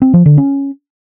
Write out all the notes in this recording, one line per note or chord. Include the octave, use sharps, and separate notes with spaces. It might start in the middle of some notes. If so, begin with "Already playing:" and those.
C4
F3
D3
C#4